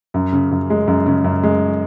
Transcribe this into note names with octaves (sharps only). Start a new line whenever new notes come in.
F#2
C#3
F#2
G#3
F#2
C#3
F#2
G#3